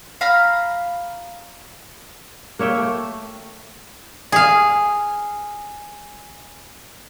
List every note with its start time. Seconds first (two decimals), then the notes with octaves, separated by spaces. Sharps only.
0.21 F5 A#5 B5 F6
2.59 A#3 C#5 E5 G5
2.78 A3
4.32 G#4 F5